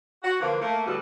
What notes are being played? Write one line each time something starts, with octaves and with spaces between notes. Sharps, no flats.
F#4
D3 E3 F3 A#3
A3 A#3
D2 A2 G3 B3 F#4 A4